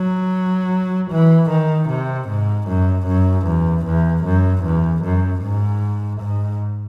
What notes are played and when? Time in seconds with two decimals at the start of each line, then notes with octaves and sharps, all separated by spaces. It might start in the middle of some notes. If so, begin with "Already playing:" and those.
Already playing: F#3
1.11 E3
1.50 D#3
1.89 C3
2.28 G#2
2.68 F#2
3.07 F#2
3.46 E2
3.86 E2
4.25 F#2
4.64 E2
5.03 F#2
5.42 G#2
6.21 G#2